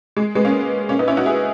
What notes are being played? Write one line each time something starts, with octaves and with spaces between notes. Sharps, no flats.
G#3
G#3 B3
A#3 C#4
A#3 C#4
B3 D#4
C#4 E4
D#4 F#4
E4 G#4